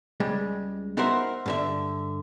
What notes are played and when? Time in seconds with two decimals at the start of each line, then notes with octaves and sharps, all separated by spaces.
0.20 C#2 G3 G#3
0.97 B3 D#4 F#4 A#4 C5 E5
1.46 G2 D3 E5